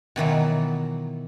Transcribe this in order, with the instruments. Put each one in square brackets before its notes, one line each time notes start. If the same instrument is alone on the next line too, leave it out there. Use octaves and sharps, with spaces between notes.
[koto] B2 D#3 E3 F#3